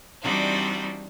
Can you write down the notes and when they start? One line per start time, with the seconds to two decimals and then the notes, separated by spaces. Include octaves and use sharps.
0.22 E3 G3 C4 D4 D#4 F#4